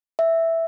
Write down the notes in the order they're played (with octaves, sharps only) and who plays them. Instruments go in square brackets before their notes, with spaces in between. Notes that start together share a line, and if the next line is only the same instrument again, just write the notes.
[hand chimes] E5